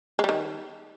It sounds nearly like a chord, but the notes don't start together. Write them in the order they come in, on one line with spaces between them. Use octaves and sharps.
G#3 G3 D#3